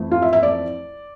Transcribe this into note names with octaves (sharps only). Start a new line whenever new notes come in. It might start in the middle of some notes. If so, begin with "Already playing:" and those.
Already playing: F2 E3 A3
F4
E5
E5
D5